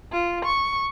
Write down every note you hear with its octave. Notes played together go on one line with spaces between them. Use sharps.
F4
C#6